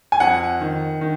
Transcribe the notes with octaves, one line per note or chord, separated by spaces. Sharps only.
G#5
F2 F#5
D#3
D#3